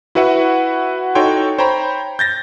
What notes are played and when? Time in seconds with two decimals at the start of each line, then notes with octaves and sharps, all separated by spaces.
0.15 E4 F#4 B4 E5 F#5
1.15 D#4 F#4 A4 C#5 G5 C6
1.58 C5 C#5 G5 A#5 B5
2.19 G6 A6 A#6